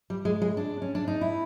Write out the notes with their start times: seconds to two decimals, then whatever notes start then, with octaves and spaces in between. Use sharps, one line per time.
0.10 G3
0.25 G#3
0.42 G#3
0.57 D4
0.82 C#4
0.95 D4
1.08 D#4
1.21 E4